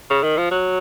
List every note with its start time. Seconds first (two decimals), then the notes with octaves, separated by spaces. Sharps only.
0.10 C#3
0.23 D#3
0.37 F3
0.51 F#3